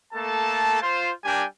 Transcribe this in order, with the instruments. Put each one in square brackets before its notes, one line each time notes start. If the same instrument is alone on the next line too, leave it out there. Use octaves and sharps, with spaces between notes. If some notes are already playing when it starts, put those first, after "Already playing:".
[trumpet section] A3 A#3 A4 A5
F4 C5
G3 D4 G4 A#4 G5 G#5